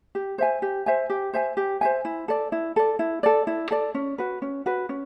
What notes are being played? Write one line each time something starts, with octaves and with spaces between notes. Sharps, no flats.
G4
C5 E5 G#5
G4
C5 E5 G#5
G4
C5 E5 G#5
G4
C5 E5 G#5
E4
A4 D5
E4
A4 D5
E4
A4 D5
E4
A4 D5
C#4
F#4 B4
C#4
F#4 B4
C#4